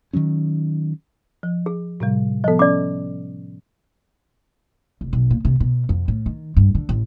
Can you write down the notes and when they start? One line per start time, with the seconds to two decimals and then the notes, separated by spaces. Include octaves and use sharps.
0.13 D#3 F3 F#3 C#4
1.43 F3
1.66 G#4
2.00 A2 C3 G3
2.44 F3 B3 A4 D#5
2.59 C#4 D5 D6
5.01 F1
5.13 B1
5.30 A#2
5.45 C3
5.60 B2
5.89 F2
6.08 A2
6.26 D#3
6.56 G2
6.75 D3
6.89 A1